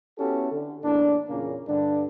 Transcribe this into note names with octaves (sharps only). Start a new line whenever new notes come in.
B3 C#4 E4 F#4 G4 A4
D3
E2 A2 A#3 D4
E2 A#2 C#3 A#3 C#4
G2 D3 D4